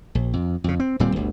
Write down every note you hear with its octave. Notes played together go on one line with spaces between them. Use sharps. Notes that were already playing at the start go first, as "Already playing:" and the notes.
A#1
F2
F2 C#3
C4
D1 A#2 G3 C4
G1 D2